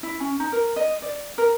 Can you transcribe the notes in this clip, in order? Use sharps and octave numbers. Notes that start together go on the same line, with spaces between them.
E4
C#4
D#4
A#4
D#5
D5
A#4